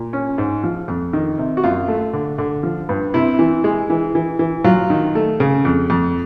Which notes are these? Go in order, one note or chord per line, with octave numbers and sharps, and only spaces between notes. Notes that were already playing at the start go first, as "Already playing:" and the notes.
Already playing: A#2
C#4
G#2
F3
F2
D#3
C3
F#4
F#2 F4
A3
D3
D3
F3
G2
C3 E4
E3
G#3
E3
E3
E3
F#3 F4
D#3
A3
C#3
F2
F2